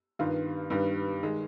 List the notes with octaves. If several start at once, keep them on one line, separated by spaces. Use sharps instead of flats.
G2 D#3 B3 F4
G2 D#3 G3 B3
D#3 G#3